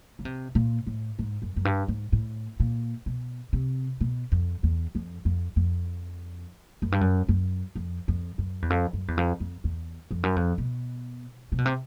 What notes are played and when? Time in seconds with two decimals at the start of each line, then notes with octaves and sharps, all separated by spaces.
0.19 C#3
0.25 C3
0.55 A#2
0.87 A2
1.19 G#2
1.42 F#2
1.56 F#2
1.65 G2
1.88 G#2
2.12 A2
2.60 A#2
3.06 B2
3.53 C3
4.01 B2
4.32 F2
4.63 E2
4.95 F2
5.25 F2
5.56 F2
6.82 F#2
6.92 G2
7.01 F#2
7.28 F#2
7.75 F2
8.08 F2
8.38 F#2
8.62 E2
8.70 F2
8.93 F#2
9.08 E2
9.17 F2
9.40 F2
9.64 E2
10.11 F2
10.23 F#2
10.36 F2
10.58 B2
11.52 C3
11.58 B2
11.66 C3